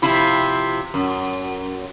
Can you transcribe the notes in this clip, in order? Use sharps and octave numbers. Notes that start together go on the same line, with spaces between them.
C3 F3 E4
F#2